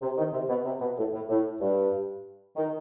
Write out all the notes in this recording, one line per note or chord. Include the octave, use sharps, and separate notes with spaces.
C3
D#3
C3
B2
C3
B2
A2
A2
A2
G2
D#3